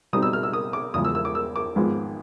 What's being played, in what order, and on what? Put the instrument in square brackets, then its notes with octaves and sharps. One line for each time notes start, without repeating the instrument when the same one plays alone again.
[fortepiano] B2 G3 C4 D#4 D#6
E6
F6
E6
D#6
D6
E2 C#3 F3 G#3 D#6
E6
E6
D6
E6
D6
G#1 G#2 F3 G#3 B3